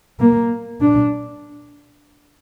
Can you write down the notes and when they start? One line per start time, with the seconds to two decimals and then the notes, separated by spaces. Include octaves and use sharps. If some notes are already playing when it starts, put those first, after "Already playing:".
0.20 A#3
0.81 D4